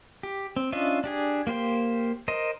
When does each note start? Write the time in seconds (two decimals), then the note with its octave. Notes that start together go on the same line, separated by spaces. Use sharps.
0.23 G4
0.56 C4
0.72 C#4 D4 F4 D#5 E5
1.04 D4 G4 G#4
1.47 A#3 G4 C5 G5
2.28 A#4 C5 D#5